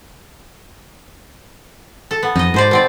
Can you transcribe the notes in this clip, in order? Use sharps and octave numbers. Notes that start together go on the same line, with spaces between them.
A4
B3
F2 D#4 D#5
G#2 B2 C5 D5
B2 C4 D5